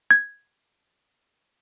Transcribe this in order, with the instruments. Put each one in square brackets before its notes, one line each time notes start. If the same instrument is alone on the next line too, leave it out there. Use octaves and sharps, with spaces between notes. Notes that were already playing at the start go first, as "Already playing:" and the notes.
[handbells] G#6